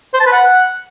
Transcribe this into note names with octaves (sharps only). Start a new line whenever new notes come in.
C5
A5
B4
F#5